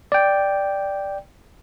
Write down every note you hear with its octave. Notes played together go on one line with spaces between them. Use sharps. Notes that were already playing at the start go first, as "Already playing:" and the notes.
D5 G5